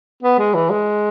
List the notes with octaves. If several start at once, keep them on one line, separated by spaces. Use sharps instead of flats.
B3
G#3
E3
G#3